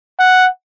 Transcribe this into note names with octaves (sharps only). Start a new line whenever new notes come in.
F#5